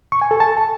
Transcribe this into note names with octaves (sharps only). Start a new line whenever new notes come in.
C#6
G#5
A4
A5